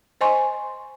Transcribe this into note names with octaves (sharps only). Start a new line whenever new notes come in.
C5 D#5 G#5 C6 C#6